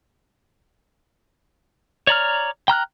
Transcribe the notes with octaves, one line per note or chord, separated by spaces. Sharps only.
C#5 D5 A#5 F6
G5 A#5 F6 F#6